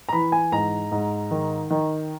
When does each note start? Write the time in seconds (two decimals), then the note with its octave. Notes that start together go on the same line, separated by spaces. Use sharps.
0.09 A#5
0.13 E3 B5
0.32 G#5
0.52 G#2 A#5
0.92 G#2
1.31 D#3
1.71 D#3